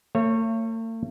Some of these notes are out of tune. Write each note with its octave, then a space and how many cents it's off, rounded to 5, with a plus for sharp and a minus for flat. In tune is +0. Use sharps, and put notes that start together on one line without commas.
A3 +45 C#5 -10